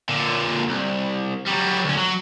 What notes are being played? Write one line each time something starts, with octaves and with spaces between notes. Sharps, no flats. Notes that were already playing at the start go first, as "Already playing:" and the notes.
A#2 D3
C2
F#3 G3
D2 C#4
F#3